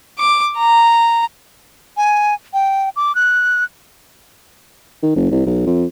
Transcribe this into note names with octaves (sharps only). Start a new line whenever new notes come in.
D6
A#5
G#5
G5
D6
F#6
D#3
F#1
C2
B1
F2